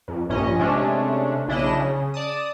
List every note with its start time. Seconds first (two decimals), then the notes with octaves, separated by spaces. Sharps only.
0.08 F2
0.29 A#1 G2 A#2 C#4 D#5
0.59 C3 G#3 A3 C#4 D4
1.48 B1 C#3 D4 E4 D#5 E7
1.76 C#3
2.14 D5 A5 D#6